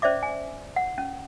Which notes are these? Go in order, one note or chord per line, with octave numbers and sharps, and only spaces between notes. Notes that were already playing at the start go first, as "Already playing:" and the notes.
C#4 C5 D5 E5 D6
G#5
F#5
C#4